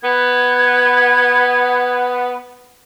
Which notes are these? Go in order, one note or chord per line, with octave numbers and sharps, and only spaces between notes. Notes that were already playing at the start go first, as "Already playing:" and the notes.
B3 G#6